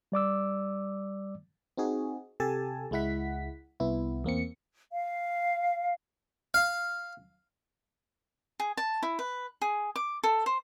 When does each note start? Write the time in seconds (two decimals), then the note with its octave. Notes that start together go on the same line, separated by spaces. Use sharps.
0.12 G3 D5 D6 E6
1.77 C4 D#4 F#4 G#4
2.40 C3 G4 A4 G#5 A5
2.91 C#2 G#3 E4 F#5 B6
3.80 C2 B3 E4
4.24 E2 A#3 C4 C#7
4.92 F5
6.54 F5
8.60 G#4
8.77 A5
9.03 E4
9.19 B4
9.62 G#4
9.96 D6
10.24 A4
10.46 C5